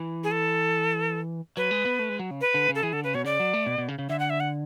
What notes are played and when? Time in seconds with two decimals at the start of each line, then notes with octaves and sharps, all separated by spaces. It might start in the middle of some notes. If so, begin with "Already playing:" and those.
Already playing: E3
0.24 G#4
0.31 A4
1.57 F#3 B4
1.71 G#3
1.86 B3
1.99 A3
2.09 G#3
2.19 F#3
2.31 C#3
2.41 B4
2.54 D3
2.69 C#3
2.75 A4
2.83 E3 G#4
2.93 D3 A4
3.04 C#3 B4
3.15 B2 C#5
3.24 C#3 D5
3.40 F#3
3.53 A3
3.66 B2
3.78 B2
3.88 C#3
3.99 C#3
4.09 D3 E5
4.20 F#5
4.30 E5
4.40 F#5